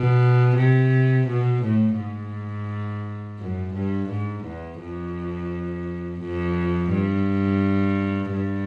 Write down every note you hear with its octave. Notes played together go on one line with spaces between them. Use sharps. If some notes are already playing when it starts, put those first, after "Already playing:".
Already playing: B2
C3
B2
A2
G#2
F#2
G2
G#2
E2
F2
F2
G2
G2